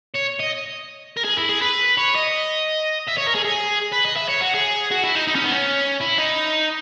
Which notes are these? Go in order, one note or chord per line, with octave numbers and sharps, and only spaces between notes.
C#5
D#5
A#4
G#4
E4
G#4
B4
C#5
D#5
E5
C#5
A#4
G#4
G#4
B4
D#5
E5
C#5
F#4
G#4
F#4
E4
D#4
D#4
C#4
B3
C#4
E4
D#4